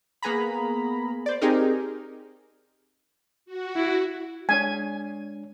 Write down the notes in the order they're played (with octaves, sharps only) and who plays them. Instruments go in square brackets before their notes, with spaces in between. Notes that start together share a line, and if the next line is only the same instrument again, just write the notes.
[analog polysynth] A#3 B3 G#4 A#5 B5
C5 D5
C4 D#4 G4 G#4 A#4
[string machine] F#4
[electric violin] E4
[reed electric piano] G#3 D4 C#5 [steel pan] G#5